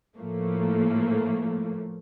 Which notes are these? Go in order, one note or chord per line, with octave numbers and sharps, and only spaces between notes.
A2 F3 A3 A#3